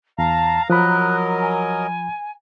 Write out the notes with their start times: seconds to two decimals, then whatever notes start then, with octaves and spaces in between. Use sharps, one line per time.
0.18 E2 F5 A5 A#5
0.70 F3 F#3 A#4 D#5 B5 F#6
1.42 G#5